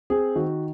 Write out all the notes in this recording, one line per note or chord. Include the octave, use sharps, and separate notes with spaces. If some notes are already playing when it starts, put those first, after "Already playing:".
C4 G#4
D#3 F#4